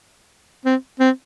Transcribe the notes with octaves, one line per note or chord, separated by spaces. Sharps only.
C4
C4